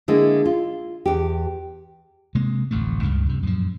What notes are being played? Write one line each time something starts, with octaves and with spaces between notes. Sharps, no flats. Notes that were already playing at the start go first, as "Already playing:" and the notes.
D3 G#3 A#3 E4
F4
E2 G4
C3 G#3 A#3
D1 A1 F2 A3
C#2 G2 C#3
G2 C3
F#2 A#2 F3